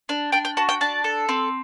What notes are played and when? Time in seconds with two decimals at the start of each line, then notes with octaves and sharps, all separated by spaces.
0.09 D4
0.32 D4 G5
0.45 G5
0.57 F#4 A5
0.69 G5
0.81 D4 A5
1.04 A4
1.29 C4